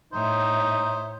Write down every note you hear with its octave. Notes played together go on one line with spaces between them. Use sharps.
A2 D#4 C5 C#5 E5